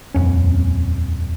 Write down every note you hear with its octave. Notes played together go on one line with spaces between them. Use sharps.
D#1 F2 C#4